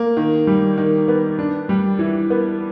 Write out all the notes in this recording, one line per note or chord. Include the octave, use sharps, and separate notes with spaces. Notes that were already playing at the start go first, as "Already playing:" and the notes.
Already playing: A#3
D#3
G3
D#3
B3
D4
G3
E3
B3